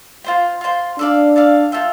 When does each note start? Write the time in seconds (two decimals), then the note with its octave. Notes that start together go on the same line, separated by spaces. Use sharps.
0.24 F4 C5 G5
0.61 F4 C5 G5
0.98 D4 A4 D5 F5
1.36 A4 D5 F5
1.72 F4 A4 E5 G5